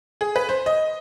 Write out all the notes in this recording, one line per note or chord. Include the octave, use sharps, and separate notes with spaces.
G#4
B4
C5
D#5